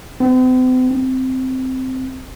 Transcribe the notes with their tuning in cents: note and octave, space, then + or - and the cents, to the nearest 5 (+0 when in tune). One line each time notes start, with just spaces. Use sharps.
C4 -45
C4 -10